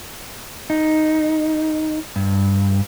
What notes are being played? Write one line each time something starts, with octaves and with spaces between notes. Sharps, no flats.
D#4
G2